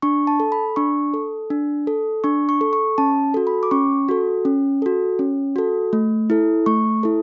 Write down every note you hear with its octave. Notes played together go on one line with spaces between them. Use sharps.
D4 C#6
A5
A4
B5
D4 C#6
A4
D4
A4
D4 C#6
C#6
A4
C#6
C#4 A5
F#4 A4
B5
D6
C#4 C#6
F#4 A4
C#4
F#4 A4
C#4
F#4 A4
A3
E4 A4
A3 C#6
E4 A4